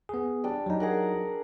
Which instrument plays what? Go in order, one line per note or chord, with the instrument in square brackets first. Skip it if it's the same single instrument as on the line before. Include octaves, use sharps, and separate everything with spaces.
[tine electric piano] B3 G#4
[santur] G3 D4
[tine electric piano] F#3 D#4
[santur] G#4 A#4 F#5